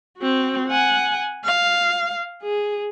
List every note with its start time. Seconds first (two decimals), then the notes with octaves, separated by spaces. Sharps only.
0.18 C4 F#4
0.68 F#5 G#5
1.45 F5
2.43 G#4